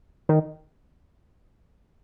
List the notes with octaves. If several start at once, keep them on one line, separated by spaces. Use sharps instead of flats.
D#3